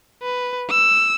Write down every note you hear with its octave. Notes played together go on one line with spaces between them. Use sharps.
B4
E6